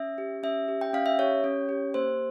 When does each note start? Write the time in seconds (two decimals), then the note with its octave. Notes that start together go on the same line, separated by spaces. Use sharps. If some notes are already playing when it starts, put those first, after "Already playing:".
Already playing: C#4 E5
0.18 G4
0.43 C#4 E5
0.68 G4
0.81 G5
0.93 C#4 F5
1.06 E5
1.19 G4 C#5
1.44 C#4
1.69 G4
1.94 A#3 C5